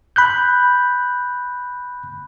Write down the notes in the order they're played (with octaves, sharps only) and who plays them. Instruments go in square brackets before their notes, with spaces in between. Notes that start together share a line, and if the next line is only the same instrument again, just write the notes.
[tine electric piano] B5 F#6 G6